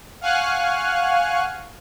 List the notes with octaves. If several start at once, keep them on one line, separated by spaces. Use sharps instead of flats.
F5 F#5 G#5 C#6 F6 F#6